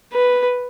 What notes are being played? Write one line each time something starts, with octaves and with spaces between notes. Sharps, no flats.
B4